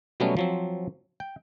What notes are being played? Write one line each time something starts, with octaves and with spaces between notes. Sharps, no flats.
B2 F#3 G3 A3 B3 C#4
F3 F#3 C4
G5